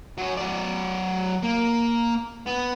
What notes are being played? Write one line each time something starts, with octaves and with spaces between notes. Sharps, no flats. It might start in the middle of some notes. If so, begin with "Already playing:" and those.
F#3 C#4
F#3 D5
A#3
B3